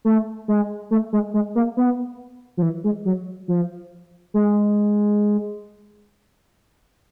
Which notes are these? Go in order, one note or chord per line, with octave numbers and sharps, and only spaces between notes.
A3
G#3
A3
G#3
G#3
A#3
B3
F3
E3
G#3
F#3
F3
G#3